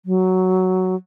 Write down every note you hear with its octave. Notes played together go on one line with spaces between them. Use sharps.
F#3